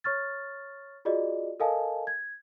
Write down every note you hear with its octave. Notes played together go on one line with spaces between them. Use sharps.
C#5 C#6 F6 A6
F4 F#4 G#4 D5 D#5
A4 A#4 D#5 F5 G#5 A5
G#6